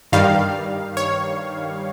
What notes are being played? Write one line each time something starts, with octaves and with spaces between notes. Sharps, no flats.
G2 D#3 G3 F5
C#5